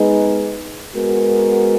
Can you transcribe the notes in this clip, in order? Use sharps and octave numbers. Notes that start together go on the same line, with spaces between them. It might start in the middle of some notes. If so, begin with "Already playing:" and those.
Already playing: G#3 B3 D#4 G#4 B4
G#3 B3 F#4 A#4